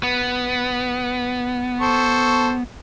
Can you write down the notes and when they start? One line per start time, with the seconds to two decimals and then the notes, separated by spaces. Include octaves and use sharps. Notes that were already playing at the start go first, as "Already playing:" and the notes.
0.03 B3
1.81 A4 C5 C#6